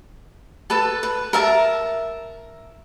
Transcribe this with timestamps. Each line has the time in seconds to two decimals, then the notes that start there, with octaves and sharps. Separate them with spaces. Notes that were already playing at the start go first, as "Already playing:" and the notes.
0.70 A4 B4 A5
1.03 B4
1.33 A#4 E5 A5